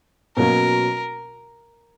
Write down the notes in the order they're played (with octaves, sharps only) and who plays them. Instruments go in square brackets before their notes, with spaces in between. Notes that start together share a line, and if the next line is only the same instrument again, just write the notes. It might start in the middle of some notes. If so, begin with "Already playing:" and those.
[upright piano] B2 F#3 A#3 C#4 F#4 [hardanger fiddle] A#4